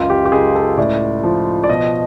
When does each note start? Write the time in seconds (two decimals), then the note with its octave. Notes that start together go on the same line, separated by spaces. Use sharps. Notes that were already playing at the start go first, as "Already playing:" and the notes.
Already playing: C#2 F#2 F4
0.10 G4
0.25 G4
0.32 C#2 G#4
0.55 A4
0.77 A2 D5
1.23 F3
1.64 D5
1.69 B2 D#5